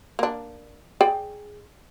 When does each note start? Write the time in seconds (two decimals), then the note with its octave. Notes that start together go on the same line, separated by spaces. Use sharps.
0.19 A#3 D4
1.01 G#4 D5 G5